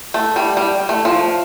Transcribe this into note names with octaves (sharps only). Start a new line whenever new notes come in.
A3
G3
G3
A3
F3